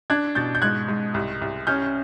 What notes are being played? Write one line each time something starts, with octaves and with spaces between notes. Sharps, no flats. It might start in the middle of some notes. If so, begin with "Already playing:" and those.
D4 F#6 G#6
B2 G6 A6
G6
G#2 F#6 G#6
G#2
C2
C2
C#4 F6 G6